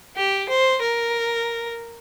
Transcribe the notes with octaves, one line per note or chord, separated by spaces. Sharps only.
G4
C5
A#4